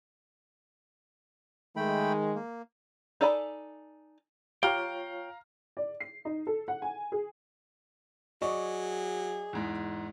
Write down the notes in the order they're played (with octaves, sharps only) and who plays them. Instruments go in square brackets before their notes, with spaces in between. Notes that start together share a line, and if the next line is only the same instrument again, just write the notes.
[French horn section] D#3 G#3 [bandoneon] A3 G5 B5
[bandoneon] A#3
[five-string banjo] D#4 A4 D5 G#5 B5
[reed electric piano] F4 C#5 [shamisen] G4 [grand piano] F5 A#5 F6 [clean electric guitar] G5
[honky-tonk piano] D5
C7
D#4
A4
F#5
G#5
G#4
[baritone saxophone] F#3 [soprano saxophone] G#4 [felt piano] D5 D#5 C#6
[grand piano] E2 G#2